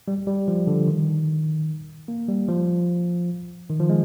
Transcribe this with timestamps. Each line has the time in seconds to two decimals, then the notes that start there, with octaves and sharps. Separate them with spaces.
0.08 G3
0.27 G3
0.48 F3
0.67 D3
0.88 D#3
2.08 A#3
2.28 G3
2.48 F3
3.70 D#3
3.80 F3
3.90 G#3